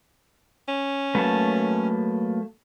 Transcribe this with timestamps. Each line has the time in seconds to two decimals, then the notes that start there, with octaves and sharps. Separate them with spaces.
0.68 C#4
1.15 F#3 A3 A#3 B4 A5